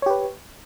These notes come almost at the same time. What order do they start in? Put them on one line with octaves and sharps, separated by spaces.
C#5 G4 B4